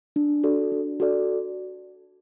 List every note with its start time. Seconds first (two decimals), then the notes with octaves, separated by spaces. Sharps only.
0.16 D4
0.43 F#4 A4 D5
0.72 D4
1.00 F#4 A4 D5